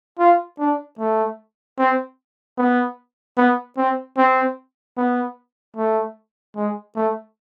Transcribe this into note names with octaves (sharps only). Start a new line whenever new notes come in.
F4
D4
A3
C4
B3
B3
C4
C4
B3
A3
G#3
A3